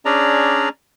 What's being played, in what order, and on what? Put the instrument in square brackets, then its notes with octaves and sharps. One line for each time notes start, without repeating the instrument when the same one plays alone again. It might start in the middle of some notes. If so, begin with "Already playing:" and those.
[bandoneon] C#4 D4 G#4 D5 A#5